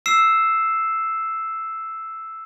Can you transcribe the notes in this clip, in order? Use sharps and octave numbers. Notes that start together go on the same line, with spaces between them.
E6 C7 E7